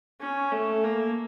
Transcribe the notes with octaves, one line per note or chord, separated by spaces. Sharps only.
C#4
A3
A#3